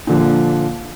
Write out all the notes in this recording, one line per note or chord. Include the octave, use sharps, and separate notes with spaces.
A#2 D3 F3